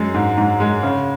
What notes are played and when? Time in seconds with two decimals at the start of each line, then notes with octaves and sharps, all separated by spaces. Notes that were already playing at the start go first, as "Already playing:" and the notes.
Already playing: F#2 G#3
0.14 G#2
0.38 G#2
0.60 G#3
0.83 C#3